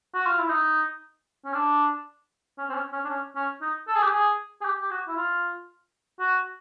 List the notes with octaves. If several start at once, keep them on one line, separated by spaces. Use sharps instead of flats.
F#4
F4
E4
D#4
C#4
D4
C#4
C4
C#4
C#4
D4
C#4
C#4
D#4
A4
G#4
G4
G#4
G#4
G4
G4
F#4
E4
F4
F#4